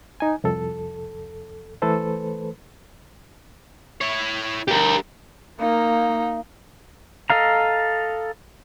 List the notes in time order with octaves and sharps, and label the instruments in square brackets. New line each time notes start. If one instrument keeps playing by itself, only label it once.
[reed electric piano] D#4 G#5
C2 F2 A4
E3 A3 A4 B4 C5
[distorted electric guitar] E4 C#5
[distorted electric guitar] G2 [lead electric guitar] G4 A#4
[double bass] A#3 [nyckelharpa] D#4 [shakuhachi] F5
[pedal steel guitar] A4 D#5 F5 A#5